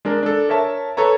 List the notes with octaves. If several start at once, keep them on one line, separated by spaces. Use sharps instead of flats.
G#3 D4 A#4
D4 A4
A#4 C#5 E5 A5
A4 B4 C#5 A#5